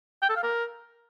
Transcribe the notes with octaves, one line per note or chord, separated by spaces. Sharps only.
G5
A4
F5
A#4